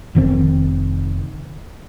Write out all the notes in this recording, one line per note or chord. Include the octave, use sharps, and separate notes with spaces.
F1 D#3 C4